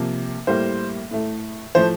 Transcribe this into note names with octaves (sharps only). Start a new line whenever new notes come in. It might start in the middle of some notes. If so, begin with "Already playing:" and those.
Already playing: C3 F3 A#3
A2 G3 A#3 C5
A2 A3
A2 F3 A3 C5